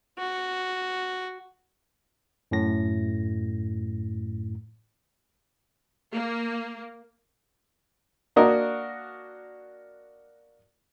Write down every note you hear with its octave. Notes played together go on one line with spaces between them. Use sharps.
F#4
F#2 A2 A#6
A#3
A#3 D4 F#4 A#4 D#5